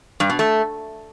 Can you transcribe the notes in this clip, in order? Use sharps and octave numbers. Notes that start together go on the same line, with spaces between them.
G2
B2
A3